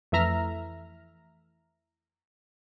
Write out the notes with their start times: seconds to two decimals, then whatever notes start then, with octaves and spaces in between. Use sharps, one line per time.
0.12 F2 E3 A3 E5 A#5 F6